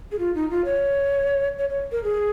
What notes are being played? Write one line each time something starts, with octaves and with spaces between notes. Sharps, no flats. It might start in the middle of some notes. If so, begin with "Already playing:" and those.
G#4
F4
D#4
F4
C#5
C#5
C#5
A#4
G#4